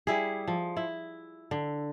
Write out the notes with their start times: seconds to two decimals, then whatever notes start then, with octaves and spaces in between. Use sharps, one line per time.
0.07 G3 E4 G#4
0.48 F3
0.77 E4
1.51 D3